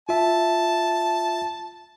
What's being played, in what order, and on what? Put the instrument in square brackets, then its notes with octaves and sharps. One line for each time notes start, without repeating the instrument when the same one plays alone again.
[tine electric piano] F4 E5 [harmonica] A5